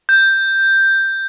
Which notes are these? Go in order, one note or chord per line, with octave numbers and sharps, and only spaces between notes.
G6